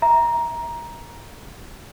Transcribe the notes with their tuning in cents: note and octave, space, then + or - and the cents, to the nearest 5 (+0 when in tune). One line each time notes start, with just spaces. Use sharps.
E5 +0 A#5 +10